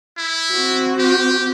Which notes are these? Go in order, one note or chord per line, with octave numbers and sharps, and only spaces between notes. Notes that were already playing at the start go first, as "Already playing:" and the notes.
E4
C4 F#4
G4